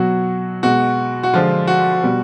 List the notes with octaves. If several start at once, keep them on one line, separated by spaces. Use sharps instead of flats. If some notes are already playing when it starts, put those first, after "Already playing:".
Already playing: B2 F#3 F#4
B2 G#3 F#4
F#4
D3 F3 G#3 F4
F#4
B2 G3